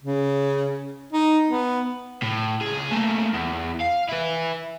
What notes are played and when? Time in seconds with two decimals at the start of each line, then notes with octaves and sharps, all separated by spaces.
0.02 C#3
1.13 D#4
1.50 B3
2.23 A2
2.62 C#2 G#4
2.92 A3 A#3
3.33 E2
3.80 F5
4.09 E4 B4